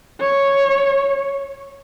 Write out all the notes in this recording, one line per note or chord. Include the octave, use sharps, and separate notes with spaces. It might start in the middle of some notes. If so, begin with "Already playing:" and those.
C#5